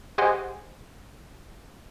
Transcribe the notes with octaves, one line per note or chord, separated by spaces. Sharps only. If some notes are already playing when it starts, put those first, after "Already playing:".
G4 G#4 C5 D#5 F#5 G#5